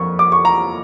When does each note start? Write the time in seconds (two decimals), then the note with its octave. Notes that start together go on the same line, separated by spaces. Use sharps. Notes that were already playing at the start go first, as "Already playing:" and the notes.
Already playing: F2 A#3 C#6
0.19 D6
0.32 C#6
0.45 A#5